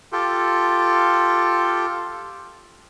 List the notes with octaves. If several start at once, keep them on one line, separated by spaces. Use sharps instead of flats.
F4 G4 A4